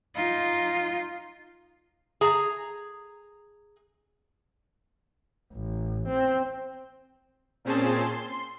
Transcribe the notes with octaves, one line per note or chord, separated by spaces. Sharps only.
D#4 F4
G#4 A#5
A1
C4
A#2 C4 C#4 G#4 C5 A5
C6